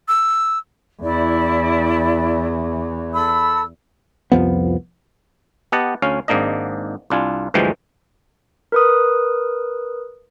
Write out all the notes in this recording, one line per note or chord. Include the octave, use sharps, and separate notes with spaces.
E6
E2 E4 D5
A4 B5 E6
C2 F2 F3 B3
B3 G4 D#5 F#5 A5
D2 C#4 F5
G#1 G#2 A#3 D4 D#5
C2 D4 F4 G#5
D2 G2 E3 F3 G#3 G5
A#4 B4 D#6